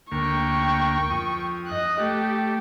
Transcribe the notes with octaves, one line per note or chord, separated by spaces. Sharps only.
D2 A#3 G5 C#6
F2 D#6
D#5 F#6
A3 G4